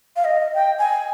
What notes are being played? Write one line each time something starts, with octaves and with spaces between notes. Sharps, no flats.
F5
D#5
G5
G#5